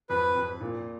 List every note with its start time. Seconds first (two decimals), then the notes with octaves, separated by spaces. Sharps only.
0.09 F2 B4
0.36 F2
0.60 A#2